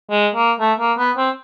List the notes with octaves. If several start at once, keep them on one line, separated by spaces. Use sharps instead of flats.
G#3
A#3
A3
A#3
B3
C4